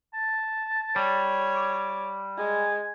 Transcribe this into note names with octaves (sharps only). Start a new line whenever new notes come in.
A5
G3 C#5
D6
G#3 G#5